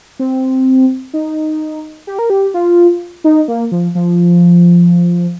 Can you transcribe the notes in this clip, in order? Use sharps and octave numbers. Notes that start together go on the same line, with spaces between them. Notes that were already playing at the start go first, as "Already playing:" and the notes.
C4
D#4
G4
A#4
G4
F4
D#4
A#3
F3
F3